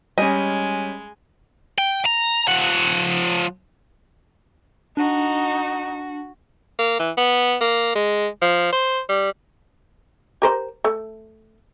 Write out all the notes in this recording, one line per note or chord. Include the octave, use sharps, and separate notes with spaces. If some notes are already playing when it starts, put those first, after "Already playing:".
G3 G#3 C#4 D#5 G#5
G5
A#5
F3 F#5
D4 D#4 F#4
A#3
E3
B3
A#3
G#3
F3
C5
G3
G4 A#4 C5
A3